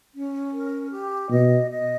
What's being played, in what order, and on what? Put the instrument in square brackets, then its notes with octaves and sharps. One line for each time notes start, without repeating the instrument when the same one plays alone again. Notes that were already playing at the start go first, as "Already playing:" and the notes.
[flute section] C#4
A#4
G4
[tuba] B2 [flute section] D#5
[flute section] D#5